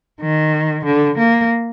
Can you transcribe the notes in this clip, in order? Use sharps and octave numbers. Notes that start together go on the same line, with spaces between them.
D#3
D3
A#3